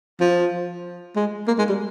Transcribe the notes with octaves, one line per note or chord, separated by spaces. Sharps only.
F3
G#3
A#3
G#3
G3